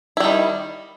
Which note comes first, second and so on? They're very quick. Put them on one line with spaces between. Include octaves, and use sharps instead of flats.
E4 G3 D#3